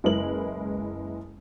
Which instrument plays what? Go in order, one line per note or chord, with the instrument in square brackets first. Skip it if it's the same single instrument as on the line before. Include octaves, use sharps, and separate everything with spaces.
[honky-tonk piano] F#1 G#3 E4 A#4 B4 F#7